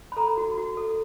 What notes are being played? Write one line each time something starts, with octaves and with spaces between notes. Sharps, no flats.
B5
A4 A#5
F#4
F#4
A4